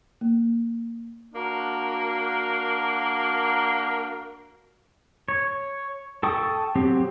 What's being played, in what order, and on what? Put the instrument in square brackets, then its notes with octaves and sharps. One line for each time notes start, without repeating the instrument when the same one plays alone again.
[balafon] A#3
[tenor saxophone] A#3 [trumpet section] D4 F#4 A#4
[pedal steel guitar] C#5
A4 G5 C#6 D#6
F#3 C4 G4